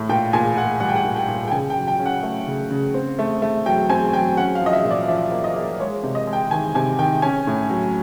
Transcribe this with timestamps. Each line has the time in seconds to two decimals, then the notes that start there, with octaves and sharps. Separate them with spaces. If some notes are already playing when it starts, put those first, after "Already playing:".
Already playing: A2
0.09 A#2 G5
0.33 A#2 G#5
0.58 A#2 F#5
0.80 G3 F#5
0.89 G5
0.96 F#5
1.04 A#2
1.16 G5
1.28 A#2
1.47 G5
1.52 C#3 G#5
1.70 G5
1.76 F#3
1.88 G5
1.99 C#4
2.06 F#5
2.23 A3
2.47 C#3
2.71 C#3
2.94 C4
3.19 A3
3.42 A3
3.66 F#3 G5
3.90 C4 G#5
4.13 F#3 G5
4.37 C#4 F#5
4.55 F5
4.61 F3
4.66 D#5
4.73 E5
4.84 A#2
4.91 D5
5.03 F5
5.08 F3 E5
5.32 A#3
5.44 D#5
5.56 A#3
5.80 G#3 C#5
6.03 C3
6.15 D#5
6.27 G#3
6.33 G5
6.51 D#3 G#5
6.75 C3 G#5
6.99 D#3 G5
7.22 C#4 G#5
7.47 A2
7.70 F#3